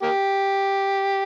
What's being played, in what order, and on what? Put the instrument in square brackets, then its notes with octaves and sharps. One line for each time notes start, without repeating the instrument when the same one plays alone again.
[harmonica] A#3 G4